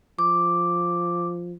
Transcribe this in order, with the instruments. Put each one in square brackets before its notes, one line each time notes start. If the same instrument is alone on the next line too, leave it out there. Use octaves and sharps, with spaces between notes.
[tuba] F3 [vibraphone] D6